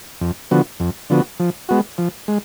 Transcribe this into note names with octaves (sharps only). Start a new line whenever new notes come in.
F2
D3 F3 B3 F#4
F2
D3 F3 B3 F#4
F3
G#3 B3 F#4
F3
G#3